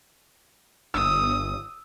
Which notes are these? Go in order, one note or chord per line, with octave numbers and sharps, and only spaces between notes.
G1 D#6 E6